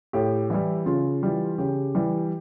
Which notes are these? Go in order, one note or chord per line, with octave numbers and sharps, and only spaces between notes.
A2 G4
E3 G3 E4
C#3 F4
E3 G3
C#3 G4
E3 G3